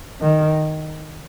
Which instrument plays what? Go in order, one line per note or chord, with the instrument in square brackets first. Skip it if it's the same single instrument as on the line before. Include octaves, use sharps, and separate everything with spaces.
[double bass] D#3